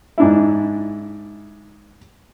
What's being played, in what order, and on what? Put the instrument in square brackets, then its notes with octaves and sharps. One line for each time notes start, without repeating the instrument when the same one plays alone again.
[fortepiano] G#2 D4 E4